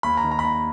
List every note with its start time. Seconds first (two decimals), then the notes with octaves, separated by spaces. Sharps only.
0.03 D#2 B5
0.17 A#5
0.24 D#3
0.31 A#5
0.39 B5
0.44 D#2 A#5